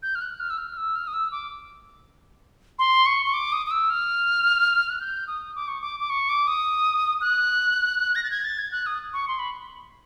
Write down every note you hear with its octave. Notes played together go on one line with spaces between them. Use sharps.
G6
F6
F#6
F6
E6
F6
E6
F6
D#6
E6
D6
C6
C#6
C#6
D6
D#6
D#6
E6
F6
F#6
G6
D#6
D6
C#6
D6
D6
C#6
D6
D#6
F#6
A#6
A6
G#6
A6
G#6
F#6
D#6
C#6
C6
B5